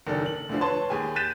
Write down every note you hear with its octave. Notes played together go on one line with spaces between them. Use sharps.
F#1 D#3 D4 A4 D5
F#7
D2 D3 F3
B4 C#5 A5 C6
D#2 G4 G#4 G#5
F#6 G6 A6 B6 D#7 E7